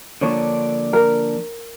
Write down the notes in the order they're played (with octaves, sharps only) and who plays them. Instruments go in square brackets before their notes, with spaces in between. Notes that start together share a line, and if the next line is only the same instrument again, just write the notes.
[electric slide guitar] D3 F3 A#3 D4 [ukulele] C#5
[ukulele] A#4